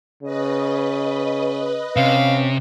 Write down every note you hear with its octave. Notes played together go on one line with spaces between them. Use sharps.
C#3 B4 D#5
C3 C#4 F5